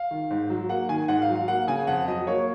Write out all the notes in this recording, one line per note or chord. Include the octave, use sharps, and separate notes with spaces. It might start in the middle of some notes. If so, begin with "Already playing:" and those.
Already playing: F5
D#3
G#2
F#3
A#3 F#5
D#3 G#5
G#2 F#5
F5
F#3
F5
A#3 F#5
C#3 G#5
F2 F#5
F#3 D#5
A#3 C#5